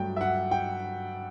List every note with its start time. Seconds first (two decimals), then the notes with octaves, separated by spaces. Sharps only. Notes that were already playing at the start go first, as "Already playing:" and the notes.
Already playing: G2 F#3 A3 G5
0.16 E5
0.21 F#5
0.51 G5